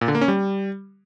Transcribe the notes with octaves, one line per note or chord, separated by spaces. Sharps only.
A#2
D3
A#3
C#4
G3